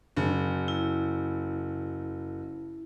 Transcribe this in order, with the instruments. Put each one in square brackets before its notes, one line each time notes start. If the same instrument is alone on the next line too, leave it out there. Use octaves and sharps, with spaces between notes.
[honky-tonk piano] F#1
[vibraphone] E4